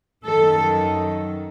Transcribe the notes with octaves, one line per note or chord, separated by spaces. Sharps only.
F#2 D#3 F#3 A4